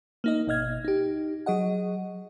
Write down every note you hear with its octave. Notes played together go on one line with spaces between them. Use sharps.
A#3 D#4 D#5
G#1 B2 D#5 F6 G#6
D#4 G4
F#3 G#4 D#5 F#5